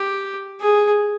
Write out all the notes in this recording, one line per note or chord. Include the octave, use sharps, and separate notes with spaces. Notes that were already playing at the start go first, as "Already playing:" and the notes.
Already playing: G4
G#4